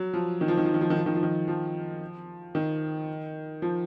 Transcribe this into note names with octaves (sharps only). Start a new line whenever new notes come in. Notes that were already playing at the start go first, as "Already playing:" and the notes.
Already playing: F#3
F3
D#3
F3
D#3
F3
D#3
F3
D#3
F3
D#3
F3
D#3
F3
D#3
F3